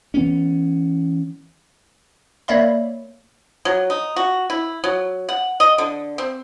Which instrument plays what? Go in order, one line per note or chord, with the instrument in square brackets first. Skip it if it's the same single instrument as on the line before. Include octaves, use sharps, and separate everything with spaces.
[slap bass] E3 B3 C#4
[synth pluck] A#3 C#5 D5 E5 B5
[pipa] F#3
D#4
F#4
E4
F#3
F#5
D#5
D3
C4